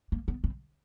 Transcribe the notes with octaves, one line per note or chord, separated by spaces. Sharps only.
A#3
B3
C4